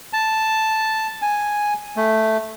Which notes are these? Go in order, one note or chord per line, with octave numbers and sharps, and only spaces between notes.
A5
G#5
A3